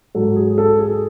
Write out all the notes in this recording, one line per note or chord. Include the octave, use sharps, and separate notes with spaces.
G#2 F#3 A4
G#4
A4
G#4